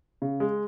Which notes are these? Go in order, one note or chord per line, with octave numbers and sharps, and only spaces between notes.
C#3
G#3